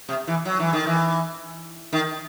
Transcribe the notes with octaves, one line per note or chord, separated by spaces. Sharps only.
C3
E3
F#3
E3
D#3
E3
D#3